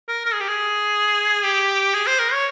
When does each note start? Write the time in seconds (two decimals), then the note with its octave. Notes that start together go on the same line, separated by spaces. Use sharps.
0.08 A#4
0.25 A#4
0.33 G#4
0.41 G4
0.48 G#4
1.44 G4
1.94 G#4
2.07 C5
2.19 A#4
2.33 C#5